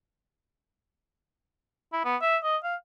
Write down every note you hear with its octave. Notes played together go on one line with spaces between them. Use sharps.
E4
B3
E5
D#5
F5